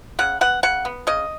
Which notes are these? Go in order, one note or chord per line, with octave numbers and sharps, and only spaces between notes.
C#3 F#5
B3 F#5
C#3 F#5
B3
C#3 D#5